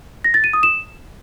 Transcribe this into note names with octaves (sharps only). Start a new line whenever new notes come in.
A#6
A6
D#7
D#6
E7